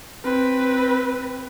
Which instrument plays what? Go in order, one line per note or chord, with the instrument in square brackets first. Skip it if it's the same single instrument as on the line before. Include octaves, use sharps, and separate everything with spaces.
[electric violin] C4 B4